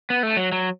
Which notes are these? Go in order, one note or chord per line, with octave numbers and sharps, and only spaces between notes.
B3
A3
F#3
F#3